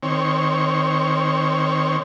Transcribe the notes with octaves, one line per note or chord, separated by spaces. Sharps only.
D#3 C4 C#5